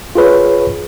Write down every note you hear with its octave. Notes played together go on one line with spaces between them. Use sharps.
F4 G#4 B4 C#5